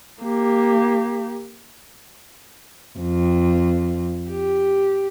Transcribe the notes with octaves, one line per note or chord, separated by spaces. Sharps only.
A#3 G4
F2
G4